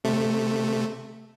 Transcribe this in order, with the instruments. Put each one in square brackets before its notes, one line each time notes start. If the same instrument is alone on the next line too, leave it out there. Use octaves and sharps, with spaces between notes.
[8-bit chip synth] C3 A3